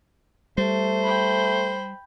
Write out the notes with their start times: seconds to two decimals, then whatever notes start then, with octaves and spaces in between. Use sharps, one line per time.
0.58 G3 A3 C5
1.03 G5 B5